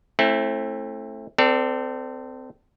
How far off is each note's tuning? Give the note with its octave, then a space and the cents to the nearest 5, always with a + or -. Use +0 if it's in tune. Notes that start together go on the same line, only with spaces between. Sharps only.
A3 +0 C4 +35 E4 +0
C4 -25 A4 +20 D5 +0